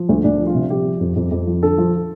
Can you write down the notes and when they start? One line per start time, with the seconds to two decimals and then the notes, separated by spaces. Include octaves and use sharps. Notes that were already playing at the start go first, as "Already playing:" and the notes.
Already playing: F3
0.09 D2
0.24 D2 D4
0.39 F3
0.47 F4
0.55 C3
0.70 F3 G4
0.85 F3
1.00 F2
1.16 F2
1.31 F2
1.47 F3
1.62 D3 A4
1.78 F3